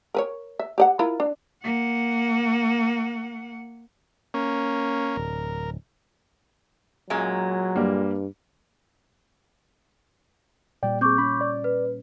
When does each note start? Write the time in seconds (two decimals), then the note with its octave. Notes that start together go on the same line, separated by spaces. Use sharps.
0.14 A#4 B4 C#5
0.59 E5
0.78 G4 D5 F#5
0.99 E4 F4 A#4
1.20 D4
1.64 A#3 F#5
4.34 A#3 C#4
5.17 D1 A#4
7.10 F#2 A#2 F#3 G#3
7.76 G2 G3 A#3
10.83 A#2 G3 D5 G5
11.01 C4 G#4 C#6 D6 G6
11.18 C#4 B5
11.41 D5
11.64 B4